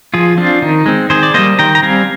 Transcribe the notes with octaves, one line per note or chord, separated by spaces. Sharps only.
F3 F4 G#4
C4 D4 F4
D#3 D#4
G#3 C4
D#3 G#4 C5
D5
G3 A#3 C5 D#5
D#3 G5 A#5
A#5
G3 C4 F5 G#5